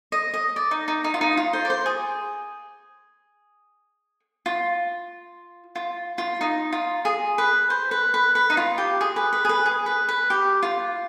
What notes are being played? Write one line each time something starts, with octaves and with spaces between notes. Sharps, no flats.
D#5
D#5
D5
D#4
D#4
D#4
F4
D#4
F4
C5
D5
C5
G#4
F4
F4
F4
D#4
F4
G#4
B4
C5
B4
B4
B4
D#4
F4
G4
G#4
B4
B4
G#4
B4
G#4
B4
B4
G4
F4